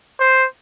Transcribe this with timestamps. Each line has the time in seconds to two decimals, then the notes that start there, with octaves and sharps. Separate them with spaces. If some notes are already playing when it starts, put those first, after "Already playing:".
0.20 C5